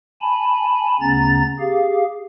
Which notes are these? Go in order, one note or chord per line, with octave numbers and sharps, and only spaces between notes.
G#5 A5 B5
D2 C#3 B3 C#4 A#5 A6
G4 G#4 F5